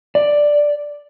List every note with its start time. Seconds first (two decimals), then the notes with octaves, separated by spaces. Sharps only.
0.15 D5